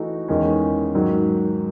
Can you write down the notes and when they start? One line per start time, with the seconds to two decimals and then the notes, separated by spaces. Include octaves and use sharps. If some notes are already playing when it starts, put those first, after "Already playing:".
Already playing: E3 A3 D#4 F#4
0.28 E2 D#3 G#3 C#4
0.95 G#2 D#3 F#3